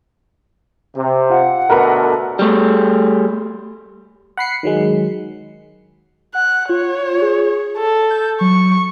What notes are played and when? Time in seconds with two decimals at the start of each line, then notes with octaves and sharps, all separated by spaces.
0.96 C3
1.30 F4 F#5
1.70 B2 D3 A3 A#4 B4 A#5
2.39 G3 A3
4.37 F#5 B5 C7 C#7
4.63 D#3 F#3 G#3
6.35 F#5 F#6
6.69 F4 C#5
7.22 G#4
7.78 A4
8.10 G6
8.41 F#3 C#6